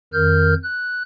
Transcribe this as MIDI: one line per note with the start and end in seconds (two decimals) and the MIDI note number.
0.13 0.54 41
0.13 0.54 51
0.13 0.54 70
0.13 0.54 89
0.13 0.54 91
0.63 1.03 90